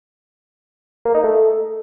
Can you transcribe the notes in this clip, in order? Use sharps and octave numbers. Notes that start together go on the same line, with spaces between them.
A#3
D#4
A3